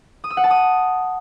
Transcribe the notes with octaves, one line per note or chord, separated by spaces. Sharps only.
D#6
E6
F#5
A5
D#6